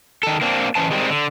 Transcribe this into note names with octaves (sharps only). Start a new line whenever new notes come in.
D#3 A4
A#3 C4 D4
E3 C#4 C5 A5
D#3 G3 G#3 A#3 C4
D3